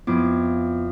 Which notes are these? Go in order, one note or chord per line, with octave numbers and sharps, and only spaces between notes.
F2 B3 E4 D6